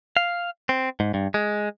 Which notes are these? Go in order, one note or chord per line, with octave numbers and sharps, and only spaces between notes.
F5
C4
G#2
G2
G#3